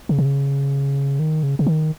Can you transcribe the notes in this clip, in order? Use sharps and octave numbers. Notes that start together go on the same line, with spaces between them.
C#3
C3
C#3
D#3
C#3
C#3
D#3